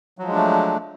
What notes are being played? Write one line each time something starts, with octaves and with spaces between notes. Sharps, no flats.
F3 F#3 G#3 A3 D4